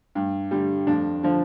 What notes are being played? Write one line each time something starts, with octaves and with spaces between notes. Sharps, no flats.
G2
D3 G3
F2 D4
D3 F3